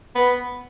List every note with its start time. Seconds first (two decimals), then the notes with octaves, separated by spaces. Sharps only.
0.15 B3